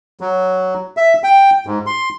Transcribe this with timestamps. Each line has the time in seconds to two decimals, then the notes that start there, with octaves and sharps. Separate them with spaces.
0.21 F#3
0.97 E5
1.24 G5
1.67 G#2
1.86 C6